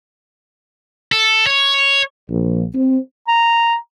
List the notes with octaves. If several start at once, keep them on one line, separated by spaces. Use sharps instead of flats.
A4
C#5
A#1
C4
A#5